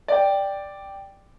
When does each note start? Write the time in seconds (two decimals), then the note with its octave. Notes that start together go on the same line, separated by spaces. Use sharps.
0.08 D5 G5